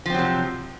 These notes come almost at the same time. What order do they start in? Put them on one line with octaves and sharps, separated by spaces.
F3 C4 F#3 C3